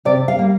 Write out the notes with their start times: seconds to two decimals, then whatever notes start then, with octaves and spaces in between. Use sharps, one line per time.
0.05 C3 D5
0.28 F5
0.39 G3 A#3